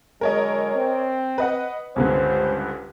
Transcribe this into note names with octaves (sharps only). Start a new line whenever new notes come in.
D3 F#3 G#3 A#4 C#5 D#5
C4
B4 D#5 F#5
C#2 G2 D3 C4 C#4 C5